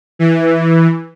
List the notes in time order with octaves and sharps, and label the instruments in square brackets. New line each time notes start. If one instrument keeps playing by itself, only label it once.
[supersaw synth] E3